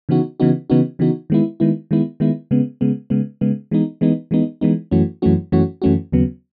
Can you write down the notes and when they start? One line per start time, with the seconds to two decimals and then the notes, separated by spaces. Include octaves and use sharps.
0.09 C#3 E3 B3 D#4 F#4
0.40 C#3 E3 B3 D#4 F#4
0.70 C#3 E3 B3 D#4 F#4
0.99 C#3 E3 B3 D#4 F#4
1.30 D#3 G#3 B3 E4
1.60 D#3 G#3 B3 E4
1.91 D#3 G#3 B3 E4
2.20 D#3 G#3 B3 E4
2.51 C#3 G#3 B3
2.81 C#3 G#3 B3
3.10 C#3 G#3 B3
3.41 C#3 G#3 B3
3.71 E3 G#3 B3 D#4
4.01 E3 G#3 B3 D#4
4.31 E3 G#3 B3 D#4
4.61 E3 G#3 B3 D#4
4.91 F#2 E3 A3 C#4 F#4
5.22 F#2 E3 A3 C#4 F#4
5.52 F#2 E3 A3 C#4 F#4
5.82 F#2 E3 A3 C#4 F#4
6.12 D#2 C#3 F#3 B3